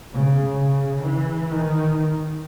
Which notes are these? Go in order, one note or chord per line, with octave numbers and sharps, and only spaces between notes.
C#3
C#3
E3
D#3